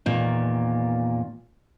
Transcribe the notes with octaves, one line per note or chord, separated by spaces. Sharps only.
E2 A#2 D#3